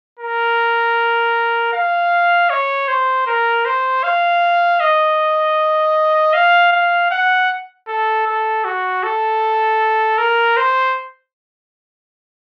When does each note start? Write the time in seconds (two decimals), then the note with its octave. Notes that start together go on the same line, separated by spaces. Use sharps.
0.19 A#4
1.73 F5
2.50 C#5
2.88 C5
3.27 A#4
3.65 C5
4.03 F5
4.80 D#5
6.34 F5
6.72 F5
7.11 F#5
7.88 A4
8.26 A4
8.65 F#4
9.03 A4
10.18 A#4
10.57 C5